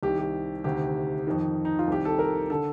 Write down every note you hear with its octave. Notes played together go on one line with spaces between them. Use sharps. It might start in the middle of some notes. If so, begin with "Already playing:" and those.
C2 C3 D#3 G4
G4
D2 C3 D#3 G4
F2 D#3
D#4
F4
C2 C3 D#3 G4
A4
A#4
D3 A4